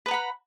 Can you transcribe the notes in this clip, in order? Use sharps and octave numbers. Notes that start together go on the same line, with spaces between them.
B4 F#5 A#5 B5